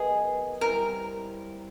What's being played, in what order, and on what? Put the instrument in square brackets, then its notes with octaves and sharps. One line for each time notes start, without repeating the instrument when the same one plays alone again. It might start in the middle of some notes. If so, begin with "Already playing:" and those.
Already playing: [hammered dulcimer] D#3 F#3 B3 [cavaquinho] G#4
[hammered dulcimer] G3 C4 E4 [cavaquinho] A#4